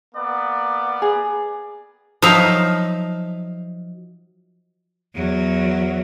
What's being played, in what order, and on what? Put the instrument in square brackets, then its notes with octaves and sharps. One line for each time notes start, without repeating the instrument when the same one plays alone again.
[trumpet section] A#3 B3 D5
[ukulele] G#4
[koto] F3 F#3 D#4 E5 F5
[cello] E2 F#3